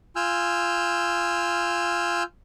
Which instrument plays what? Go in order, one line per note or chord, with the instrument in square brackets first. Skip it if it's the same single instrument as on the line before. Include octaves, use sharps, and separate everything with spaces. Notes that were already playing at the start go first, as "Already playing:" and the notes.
[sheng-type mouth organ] F4 G#5 E6 F6 G6